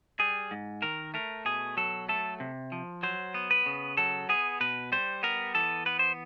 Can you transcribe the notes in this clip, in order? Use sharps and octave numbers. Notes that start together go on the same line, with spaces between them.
G3 G#4
G#2
D#3 A#4
A3 A#4
B2 G#4
F#3 A4
A3 A4
C3
F3
F#3 C5
B3
B4
C#3
F#3 A4
B3 G#4
B2 B4
G3 C5
B3 A#4
E3 A4
B3 B4
C5